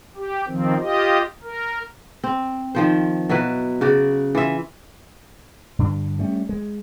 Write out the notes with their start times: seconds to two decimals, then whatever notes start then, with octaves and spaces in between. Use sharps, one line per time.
0.16 G4
0.47 D#3 F3 C4
0.81 F4 G4 D#5
1.43 A#4
2.24 C4
2.75 D#3 F3 C5
3.30 B2 F#3 E4 B4
3.81 C#3 F#4 D5
4.35 E3 F4 E5
5.79 G2 D3 D4
6.19 G3 A3 C#4
6.49 G#3